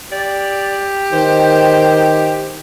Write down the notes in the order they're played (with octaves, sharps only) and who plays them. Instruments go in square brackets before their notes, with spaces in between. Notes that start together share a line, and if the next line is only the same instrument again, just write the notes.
[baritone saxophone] G4 [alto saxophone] D5
[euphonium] D#3 [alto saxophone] C5
[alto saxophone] C5